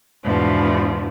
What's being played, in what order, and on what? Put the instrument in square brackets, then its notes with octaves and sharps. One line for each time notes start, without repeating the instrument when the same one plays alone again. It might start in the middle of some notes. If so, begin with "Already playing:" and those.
[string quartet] E2 G#2 B2 F3 D4